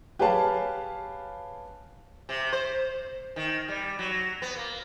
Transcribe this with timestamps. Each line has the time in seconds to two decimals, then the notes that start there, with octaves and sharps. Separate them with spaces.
0.19 G4 G#4 B4 C#5 F5 A5
2.29 C3
2.53 C5
3.36 D#3
3.68 G3
3.99 F#3
4.42 B3
4.56 A#3